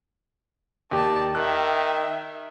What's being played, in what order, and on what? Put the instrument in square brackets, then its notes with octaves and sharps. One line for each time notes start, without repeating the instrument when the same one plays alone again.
[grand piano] D#2 G4 [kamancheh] D5 A5
[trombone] D#3 [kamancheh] E5 G5 [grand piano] F#6